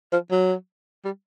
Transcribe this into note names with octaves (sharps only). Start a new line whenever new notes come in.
F3
F#3
G3